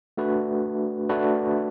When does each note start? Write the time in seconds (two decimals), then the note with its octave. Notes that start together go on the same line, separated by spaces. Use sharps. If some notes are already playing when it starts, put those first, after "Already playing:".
0.17 A3 D4 F#4 B4
1.09 A3 D4 F#4 B4